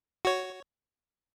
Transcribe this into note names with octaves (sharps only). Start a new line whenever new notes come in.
F#4 C#5